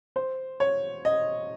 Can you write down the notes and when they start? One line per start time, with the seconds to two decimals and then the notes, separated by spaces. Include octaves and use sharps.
0.16 C5
0.60 C#5
1.05 D#5